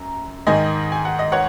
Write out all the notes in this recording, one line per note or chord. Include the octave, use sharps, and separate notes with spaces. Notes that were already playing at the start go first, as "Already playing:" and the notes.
Already playing: F#2 A#5
G#2 D#3 D#5 G#5
G#5
F#5
D#5
C#5 F#5